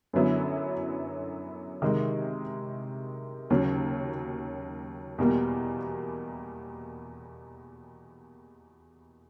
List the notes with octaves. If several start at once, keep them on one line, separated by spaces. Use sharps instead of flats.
F#2 D3 F#3 B3 E4
C3 D#3 G#3
D#2 C#3 F#3
E2 B2 G3 A#3